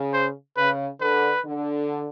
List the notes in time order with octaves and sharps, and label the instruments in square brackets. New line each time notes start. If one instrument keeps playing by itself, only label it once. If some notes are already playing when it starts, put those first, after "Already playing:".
Already playing: [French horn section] C#3
[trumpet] C5
[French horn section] C#3 [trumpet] B4
[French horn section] D3 [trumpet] B4
[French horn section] D3